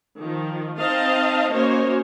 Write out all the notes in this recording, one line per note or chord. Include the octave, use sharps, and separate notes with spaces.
D#3 F3
C4 D#4 C5 D#5 F5 A5
A#3 C#4 F#4 C5 C#5 D#5